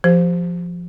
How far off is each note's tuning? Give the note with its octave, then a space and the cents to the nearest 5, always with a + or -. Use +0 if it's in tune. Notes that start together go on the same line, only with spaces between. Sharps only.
F3 +5 G4 +0 C5 -5